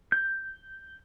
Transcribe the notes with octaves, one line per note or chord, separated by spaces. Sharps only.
G6